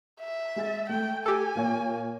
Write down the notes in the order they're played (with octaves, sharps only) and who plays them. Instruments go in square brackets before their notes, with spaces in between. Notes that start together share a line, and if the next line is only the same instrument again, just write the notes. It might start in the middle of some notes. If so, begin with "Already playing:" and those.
[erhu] E5
[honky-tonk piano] G#3 G#4 A6
[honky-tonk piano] A3 [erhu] G5
[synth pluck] G4 A4 [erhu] G#5
[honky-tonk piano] A#2 A#3 C#5